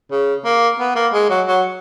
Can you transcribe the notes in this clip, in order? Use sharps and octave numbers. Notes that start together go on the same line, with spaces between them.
C#3
A#3
B3
A#3
G#3
F#3
F#3